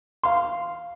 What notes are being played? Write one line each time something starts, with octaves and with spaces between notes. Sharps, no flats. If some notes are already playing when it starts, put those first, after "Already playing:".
F5 C6